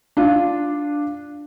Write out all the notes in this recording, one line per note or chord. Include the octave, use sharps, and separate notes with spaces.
D4 F4